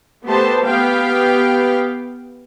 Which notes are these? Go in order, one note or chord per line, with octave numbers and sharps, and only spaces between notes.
A3 B3 G4 C5 A5
B3 G4 F5 G5